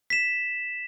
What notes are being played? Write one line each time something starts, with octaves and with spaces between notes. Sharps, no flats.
B6 E7